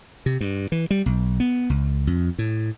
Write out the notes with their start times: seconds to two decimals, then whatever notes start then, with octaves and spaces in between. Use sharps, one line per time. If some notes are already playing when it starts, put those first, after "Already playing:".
0.26 C3
0.41 G2
0.72 E3
0.91 G3
1.06 B1
1.40 B3
1.70 C#2
2.07 F2
2.39 A2